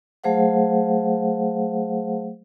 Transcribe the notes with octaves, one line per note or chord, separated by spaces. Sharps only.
F#3 A3 G#4 C5 F5 F#5